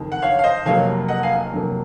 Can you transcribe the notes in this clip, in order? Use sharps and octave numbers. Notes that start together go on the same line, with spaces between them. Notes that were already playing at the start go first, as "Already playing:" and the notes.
Already playing: F#1 F2 D#3
F#5
C#5 F5
F5
C5 D#5
F1 F2 C3 F#3 A#3 C#5 F5
D#5 F#5
F5 G#5
F1 F2 C3 F#3 A#3